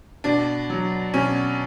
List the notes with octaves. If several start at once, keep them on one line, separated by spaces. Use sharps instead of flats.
B2 D4
F#3
B2 C#4